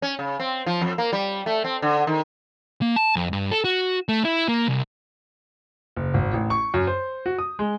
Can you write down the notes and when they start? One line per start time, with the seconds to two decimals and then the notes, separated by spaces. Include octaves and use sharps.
0.02 C#4
0.19 C#3
0.40 C4
0.66 F3
0.81 F2
0.98 A#3
1.13 G3
1.46 A3
1.64 C4
1.82 D3
2.07 D#3
2.82 A#3
2.96 A5
3.16 F2
3.33 G2
3.51 A4
3.64 F#4
4.09 A3
4.25 E4
4.48 A#3
4.67 C2
5.96 F#1
6.14 G#1
6.33 A1
6.50 C#6
6.74 F#2
6.87 C5
7.26 F#4
7.39 D#6
7.59 G#3